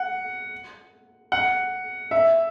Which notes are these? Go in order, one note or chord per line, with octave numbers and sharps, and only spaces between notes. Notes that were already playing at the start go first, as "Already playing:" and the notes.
Already playing: F#5
F#5
E5